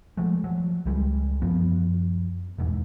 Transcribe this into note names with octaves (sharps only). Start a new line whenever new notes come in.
F3 F#3 G#3 A3
F3 F#3
C#2 G3 G#3
F#2 F3 B3
E1 E2 G#2